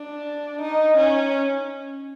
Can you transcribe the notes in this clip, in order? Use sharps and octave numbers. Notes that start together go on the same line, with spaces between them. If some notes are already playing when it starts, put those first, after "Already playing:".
Already playing: D4
D#4
C#4